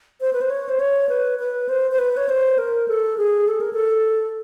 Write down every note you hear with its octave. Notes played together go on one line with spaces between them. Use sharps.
C5
B4
C5
C#5
C5
C#5
B4
B4
C5
C5
B4
C#5
C5
A#4
A4
G#4
A4
A#4
A4